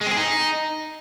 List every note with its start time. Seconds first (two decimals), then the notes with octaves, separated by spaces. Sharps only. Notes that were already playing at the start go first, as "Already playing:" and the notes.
0.01 G#3
0.06 C4
0.11 G#4
0.17 D#4